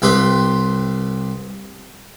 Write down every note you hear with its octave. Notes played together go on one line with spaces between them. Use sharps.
C2 G4 B4 C6